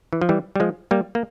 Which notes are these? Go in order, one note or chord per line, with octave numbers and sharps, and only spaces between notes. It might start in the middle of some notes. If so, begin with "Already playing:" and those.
E3
F3
E3 G3
G3
F3 G#3
G3 A#3
A#3